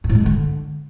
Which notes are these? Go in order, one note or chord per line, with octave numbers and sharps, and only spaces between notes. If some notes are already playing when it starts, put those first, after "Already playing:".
G2
A2
G#3
E3
D3